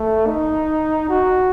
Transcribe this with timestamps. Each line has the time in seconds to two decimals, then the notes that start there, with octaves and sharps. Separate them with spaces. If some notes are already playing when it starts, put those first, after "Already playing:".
Already playing: A3
0.27 D#4
1.09 F#4